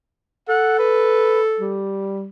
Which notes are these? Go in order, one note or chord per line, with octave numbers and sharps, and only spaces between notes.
A4 F#5
B4
G3